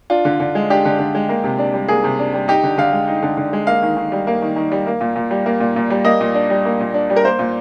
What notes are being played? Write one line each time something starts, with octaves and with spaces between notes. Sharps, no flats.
D4 F4
D3
D3
G#3
D4 G4
D3
D3
G#3
A#3
C3
D4
G3
A#3 G#4
C3
D4
G3
D#4 G4
D3
D3 F5
G#3
D#4
D3
D3
G#3
A#3 F5
D#3
D#3
G3
A#3
D#3
D#3
G3
A#3
A#2
A#2
G3
A#3
A#2
A#2
G3
A#3 D#5
A#2
D4
G3
A#3
A#2
D4
G3
A#4
A#3 C5
A#2